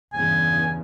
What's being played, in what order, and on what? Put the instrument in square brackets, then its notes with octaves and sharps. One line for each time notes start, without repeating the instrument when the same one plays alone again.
[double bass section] E2 G2 C#3 [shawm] G#5